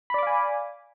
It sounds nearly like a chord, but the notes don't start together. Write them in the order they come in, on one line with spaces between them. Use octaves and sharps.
B5 D5 D6 F5 G#5